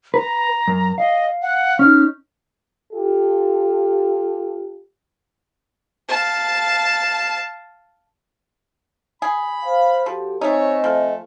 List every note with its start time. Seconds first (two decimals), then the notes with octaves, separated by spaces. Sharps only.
0.14 B4 A#5
0.68 F#2
0.98 D#5 F5
1.42 F#5
1.79 C#4 D#4 F6
2.93 F4 G4 A4
6.09 F5 A5
9.22 G#4 B5
9.64 C5 F5
10.06 F3 F#4 G4 A4
10.41 A3 C4 D#4 C#5 D#5 G#5
10.84 F3 A3